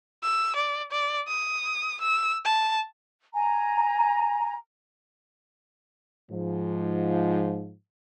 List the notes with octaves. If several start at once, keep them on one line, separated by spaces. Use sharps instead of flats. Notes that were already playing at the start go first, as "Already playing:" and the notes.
E6
D5
D5
D#6
E6
A5
G#5 A#5
G#2 F3